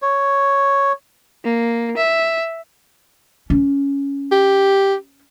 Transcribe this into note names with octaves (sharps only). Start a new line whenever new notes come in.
C#5
A#3
E5
C#4
G4